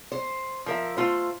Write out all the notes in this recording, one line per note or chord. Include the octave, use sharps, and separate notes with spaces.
C5
F3 A#4 E5
A3 F4 C5